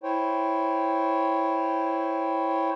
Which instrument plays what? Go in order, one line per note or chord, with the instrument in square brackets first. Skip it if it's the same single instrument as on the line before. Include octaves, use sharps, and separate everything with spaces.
[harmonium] E4 C5 C#5 G5